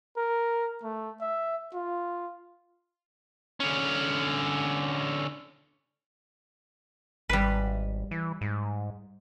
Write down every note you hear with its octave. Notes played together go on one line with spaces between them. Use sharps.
A#4
A3
E5
F4
D3 C#4
G#1 G3 B4
E3
G#2